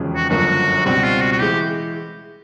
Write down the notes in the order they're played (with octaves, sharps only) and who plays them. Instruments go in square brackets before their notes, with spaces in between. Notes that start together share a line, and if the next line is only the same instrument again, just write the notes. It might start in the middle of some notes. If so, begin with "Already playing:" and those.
Already playing: [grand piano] E1 D#2 C#3 F3 G#3
[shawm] F#4
[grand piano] G1 F#2 D3 F3 A#3 [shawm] F#4
[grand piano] C#2 B2 G3 C4 [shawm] F#4
[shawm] F4
F#4
F#4
[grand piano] E3 G#3 [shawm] G4